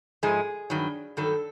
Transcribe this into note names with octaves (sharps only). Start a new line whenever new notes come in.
G#2 F3 G#3 G#4
G2 D#3 F#3
G2 D#3 F#3 A4